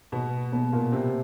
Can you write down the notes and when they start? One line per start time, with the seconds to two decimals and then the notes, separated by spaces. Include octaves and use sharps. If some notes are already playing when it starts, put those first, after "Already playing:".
0.12 B2 B3
0.52 B2 B3
0.72 A#2 A#3
0.92 C3 C4